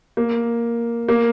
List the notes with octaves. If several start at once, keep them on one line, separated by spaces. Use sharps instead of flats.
A#3
A#3